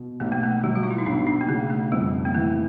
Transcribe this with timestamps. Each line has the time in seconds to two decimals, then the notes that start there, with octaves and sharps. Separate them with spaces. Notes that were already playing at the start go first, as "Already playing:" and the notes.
Already playing: B2
0.20 B1 A3
0.32 A#3
0.43 A3
0.63 F#3 G3
0.76 F#4
0.83 F4
0.91 E4
0.98 D#4
1.06 B1 D4
1.27 D4
1.41 A#3
1.48 C#3 A3
1.70 A3
1.92 F2 G3
2.25 A#3
2.35 E3 A3